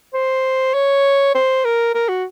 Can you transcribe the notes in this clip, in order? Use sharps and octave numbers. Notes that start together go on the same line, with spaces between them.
C5
C#5
C5
A#4
A#4
F#4